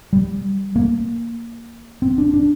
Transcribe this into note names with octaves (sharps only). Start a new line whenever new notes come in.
G3
A#3
C4
D4
D4